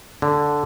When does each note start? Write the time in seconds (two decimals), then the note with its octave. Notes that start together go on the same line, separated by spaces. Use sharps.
0.22 D3